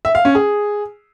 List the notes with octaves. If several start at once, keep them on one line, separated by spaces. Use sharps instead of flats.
E5
F5
C#4
G#4